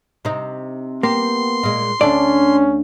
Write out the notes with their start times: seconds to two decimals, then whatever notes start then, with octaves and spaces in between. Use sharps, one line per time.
0.25 C3 D#4
1.03 A#3 B3 G4 C6
1.63 A#2 G#3
2.01 D2 C#4 D4 A4 D5